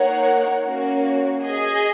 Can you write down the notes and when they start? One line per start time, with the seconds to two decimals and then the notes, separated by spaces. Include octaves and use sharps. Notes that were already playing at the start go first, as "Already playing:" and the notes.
Already playing: A#3 D#4 A#4 C#5 F#5
0.64 A#3 C#4 F#4
1.43 G#4 D#5 G#5